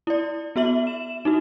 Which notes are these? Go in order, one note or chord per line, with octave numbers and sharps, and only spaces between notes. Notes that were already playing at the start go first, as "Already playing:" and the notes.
E4 D5
B3 F#4 E5 F#7
E7
D#4 E4 F#4